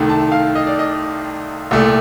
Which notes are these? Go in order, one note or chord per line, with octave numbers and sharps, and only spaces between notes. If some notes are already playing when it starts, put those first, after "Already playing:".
Already playing: C2 C3 D#3 A3
A5
F5
D#5
D5
D#5
C2 A#2 A3